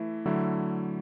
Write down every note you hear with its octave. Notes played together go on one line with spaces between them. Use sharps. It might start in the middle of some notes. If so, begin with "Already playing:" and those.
Already playing: E3 A3 E4
D3 F#3 A3 E4